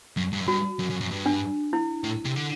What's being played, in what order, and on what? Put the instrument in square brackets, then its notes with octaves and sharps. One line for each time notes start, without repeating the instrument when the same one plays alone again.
[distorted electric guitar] F#2
G2
F#2
[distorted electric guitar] G2 [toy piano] F#4
[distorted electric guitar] F#2
F#2
F#2
G2
[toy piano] D4
E4
[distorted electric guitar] A2
C3
D3